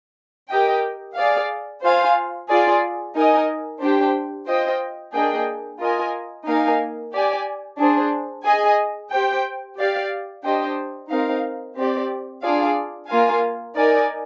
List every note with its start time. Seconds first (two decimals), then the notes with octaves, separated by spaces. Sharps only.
0.49 G4 A#4 D#5 G5
1.15 G#4 D5 F5
1.82 F4 C5 F5 G#5
2.48 F4 G#4 D5
3.15 D#4 A#4 D#5 G#5
3.81 D4 G4 C5 G5
4.47 F4 C5 D#5 G5
5.13 A#3 D4 G#4 D#5 G5
5.80 F4 A#4 D#5 G#5
6.46 A#3 D#4 A#4 F5 G#5
7.12 G4 D5 G#5
7.79 D4 G#4 C5
8.45 G#4 D#5 G#5
9.11 G4 C5 G5
9.77 G4 D5 F5
10.43 D4 G4 C5 D#5 G5
11.09 C4 D#4 A#4 F5
11.76 C4 G4 D5
12.43 D4 F4 G#4 D5 F5
13.08 A#3 F4 A#4 F5 G#5
13.75 D#4 A#4 D5 G#5